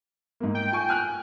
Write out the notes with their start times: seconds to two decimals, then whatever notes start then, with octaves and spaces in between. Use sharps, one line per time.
0.40 G#2 A#3
0.55 G5
0.72 F4 G#5 C#6
0.89 G#5 F6 F#6